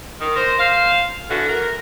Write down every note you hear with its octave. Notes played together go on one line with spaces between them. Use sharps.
D#3
A#4 C5
C5 F5
D3 E3 F#4
A#4